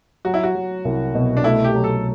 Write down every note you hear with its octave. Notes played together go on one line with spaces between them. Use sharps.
F#3 F#4
E4
F#4
F#3
C2
B2
D4
A3 E4
G4
F#3
A4